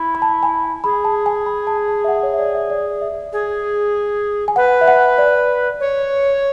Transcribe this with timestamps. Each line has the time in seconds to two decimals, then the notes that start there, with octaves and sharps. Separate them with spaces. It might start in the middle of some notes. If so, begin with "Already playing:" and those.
Already playing: E4
0.15 B5
0.22 A5
0.43 G#5
0.84 G#4 B5
1.05 A5
1.26 G#5
1.46 B5
1.67 A5
1.88 A5
2.04 E5
2.08 F#5
2.23 C#5
2.34 E5
2.39 D5
2.55 E5
2.70 D5
3.01 E5
3.32 G#4
4.48 G#5
4.56 B4 F#5
4.81 E5
4.88 F#5
5.18 D5
5.80 C#5